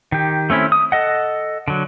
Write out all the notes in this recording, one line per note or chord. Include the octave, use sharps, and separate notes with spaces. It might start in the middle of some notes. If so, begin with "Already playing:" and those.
D#3 G4
A3 C4 C#4 E4
D#6
A4 D#5 F#5
D3 F#3